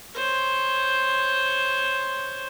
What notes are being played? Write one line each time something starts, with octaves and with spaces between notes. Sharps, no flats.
C5 C#5